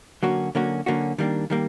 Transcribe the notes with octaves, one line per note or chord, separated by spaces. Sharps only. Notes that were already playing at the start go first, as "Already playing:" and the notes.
D3 F#3 A#3 C#4 F#4
D3 F#3 A#3 C#4 F#4
D3 F#3 A#3 C#4 F#4
D#3 G3 A#3 D4
D#3 G3 A#3